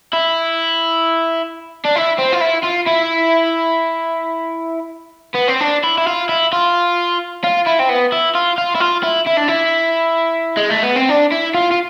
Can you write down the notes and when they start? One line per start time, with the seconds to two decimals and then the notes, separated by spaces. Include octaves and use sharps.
0.13 E4
1.85 D4
1.96 E4
2.19 C4
2.33 F4
2.41 E4
2.64 F4
2.87 E4
5.35 B3
5.48 C4
5.61 D4
5.84 E4
5.98 E4
6.07 F4
6.29 E4
6.53 F4
7.44 F4
7.66 E4
7.79 C4
7.89 B3
8.12 E4
8.35 F4
8.58 F4
8.75 E4
8.80 F4
9.03 E4
9.26 E4
9.37 D4
9.48 E4
10.57 G#3
10.70 A3
10.83 B3
10.96 C4
11.09 D4
11.32 E4
11.55 F4
11.71 F4